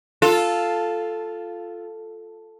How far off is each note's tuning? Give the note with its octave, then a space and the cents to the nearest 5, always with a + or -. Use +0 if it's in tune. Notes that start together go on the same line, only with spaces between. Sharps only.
F4 +0 A4 +0